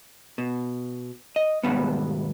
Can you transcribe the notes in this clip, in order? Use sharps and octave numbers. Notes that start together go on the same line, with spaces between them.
B2
D#5
D#2 G#2 B2 G3 B3